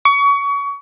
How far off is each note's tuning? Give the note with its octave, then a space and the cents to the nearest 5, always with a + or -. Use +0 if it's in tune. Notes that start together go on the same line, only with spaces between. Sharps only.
C#6 +30